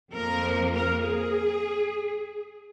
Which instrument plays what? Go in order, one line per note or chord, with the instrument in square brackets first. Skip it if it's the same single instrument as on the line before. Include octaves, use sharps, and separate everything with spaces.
[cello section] F2 F3 A#3 A#4
A#4
G#4